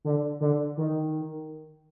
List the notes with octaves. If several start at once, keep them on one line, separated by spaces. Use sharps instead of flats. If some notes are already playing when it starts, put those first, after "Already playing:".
D3
D3
D#3